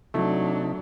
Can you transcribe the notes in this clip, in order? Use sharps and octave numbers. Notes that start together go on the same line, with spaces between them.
C3 F#3 A3 D4 D#4